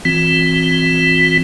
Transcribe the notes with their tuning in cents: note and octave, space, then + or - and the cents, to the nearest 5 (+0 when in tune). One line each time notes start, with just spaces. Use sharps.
E3 +10 C4 +0 F4 +45